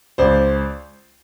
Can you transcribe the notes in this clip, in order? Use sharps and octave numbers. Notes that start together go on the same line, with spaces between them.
C#2 C5 D5